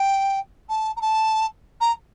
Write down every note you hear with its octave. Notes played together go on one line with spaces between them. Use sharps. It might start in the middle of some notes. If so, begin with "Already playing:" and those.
Already playing: G5
A5
A#5
A5
A#5